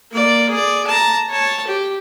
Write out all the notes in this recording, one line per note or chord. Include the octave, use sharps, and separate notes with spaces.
A#3 D5
G#4 D5
A5 A#5
C#5 A5
G4